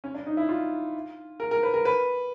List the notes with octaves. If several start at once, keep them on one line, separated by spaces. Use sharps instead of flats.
C#4
D4
D#4
E4
F4
A#4
A#4
B4
A#4
B4